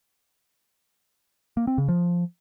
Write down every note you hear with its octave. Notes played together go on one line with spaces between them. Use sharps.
A#3
C4
C#3
F3